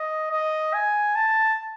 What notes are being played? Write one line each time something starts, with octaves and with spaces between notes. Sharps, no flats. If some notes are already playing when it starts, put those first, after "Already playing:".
Already playing: D#5
D#5
G#5
A5